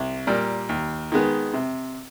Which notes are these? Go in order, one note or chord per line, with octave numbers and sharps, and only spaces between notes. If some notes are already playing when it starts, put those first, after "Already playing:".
Already playing: C2
A#2 G3 A#4
D#2
D#3 G#3 B3
C3